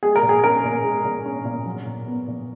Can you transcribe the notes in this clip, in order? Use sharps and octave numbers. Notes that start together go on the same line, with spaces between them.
G#3 G#4
A#4
A#2
G#4
C#4 A#4
A#2
G#3
A#2
C#4
A#2
F#3
A#2
B3
A#2